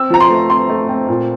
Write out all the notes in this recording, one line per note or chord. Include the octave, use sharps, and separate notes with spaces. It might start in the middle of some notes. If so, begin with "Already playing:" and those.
Already playing: C4 E6
F3 A#5
C6
A3
C4 C6
A3
C4
A#2